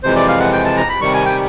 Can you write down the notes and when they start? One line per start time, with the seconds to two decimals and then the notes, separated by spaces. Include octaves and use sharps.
0.03 F2 C3 E3 G#3 C5
0.16 D5
0.28 F5
0.40 F#5
0.53 G5
0.65 A5
0.77 A#5
0.89 B5
1.01 C3 D#3 G3 C#6
1.14 G#5
1.26 G5